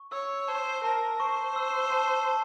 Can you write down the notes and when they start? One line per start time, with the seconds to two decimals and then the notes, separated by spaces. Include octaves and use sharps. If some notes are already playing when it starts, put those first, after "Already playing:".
Already playing: C#6
0.12 C#5 E6
0.48 C5 A5
0.84 A#4 A5
1.20 C5 C#6
1.56 E6
1.92 A5
2.28 A5